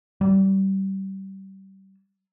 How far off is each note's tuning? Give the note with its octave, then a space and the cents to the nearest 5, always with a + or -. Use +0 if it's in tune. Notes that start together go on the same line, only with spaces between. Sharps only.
G3 -25